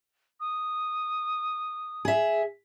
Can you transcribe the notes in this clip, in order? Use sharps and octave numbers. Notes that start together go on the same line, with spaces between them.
D#6
G#4 E5